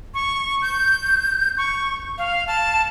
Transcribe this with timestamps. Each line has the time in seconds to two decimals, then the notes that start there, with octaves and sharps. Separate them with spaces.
0.14 C#6
0.62 G6
1.58 C#6
2.18 F5
2.47 A5